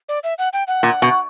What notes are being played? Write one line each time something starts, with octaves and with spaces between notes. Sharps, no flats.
D5
E5
F#5
G5
F#5
A#2
B2